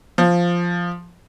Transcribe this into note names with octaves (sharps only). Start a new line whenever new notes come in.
F3